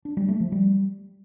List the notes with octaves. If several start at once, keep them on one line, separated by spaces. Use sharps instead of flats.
D4
G3
A3
F3
G3